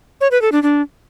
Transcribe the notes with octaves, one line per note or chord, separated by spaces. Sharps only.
C#5
B4
A4
D4
D4